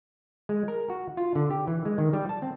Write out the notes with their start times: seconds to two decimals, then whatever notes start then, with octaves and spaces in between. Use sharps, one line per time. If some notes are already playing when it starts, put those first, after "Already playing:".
0.49 G#3
0.68 A#4
0.90 F#4
1.17 F4
1.35 D3
1.51 G4
1.67 E3
1.85 G#3
1.98 D#3
2.13 G3
2.29 A5
2.42 C4